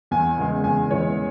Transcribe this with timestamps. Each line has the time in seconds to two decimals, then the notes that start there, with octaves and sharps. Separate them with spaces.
0.11 E2 G#5
0.37 C#3 E3 G#3
0.64 E2 G#5
0.90 C#3 E3 G#3 C#5